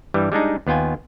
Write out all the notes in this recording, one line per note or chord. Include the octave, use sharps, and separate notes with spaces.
G2 E3 G3
G3 G#3 D4 D#4
D#2 B3 F4 G5 G#5